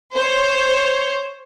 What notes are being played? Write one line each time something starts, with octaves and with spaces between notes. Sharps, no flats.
C5 C#5